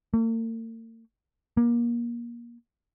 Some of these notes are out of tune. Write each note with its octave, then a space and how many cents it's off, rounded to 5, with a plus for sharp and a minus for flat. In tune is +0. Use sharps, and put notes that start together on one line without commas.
A#3 -45
A#3 +25